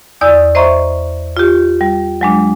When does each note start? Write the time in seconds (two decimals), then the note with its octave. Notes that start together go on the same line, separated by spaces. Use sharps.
0.21 E2 D5 D#6 E6 G6
0.55 C5 D#5 E5 A#5 C6 C#6
1.37 F4 G4
1.81 G3
2.21 F#3 G#3 D4